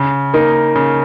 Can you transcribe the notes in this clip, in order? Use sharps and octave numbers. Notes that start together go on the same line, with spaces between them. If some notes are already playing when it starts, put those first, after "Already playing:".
Already playing: C#3
A#3 D#4
C#3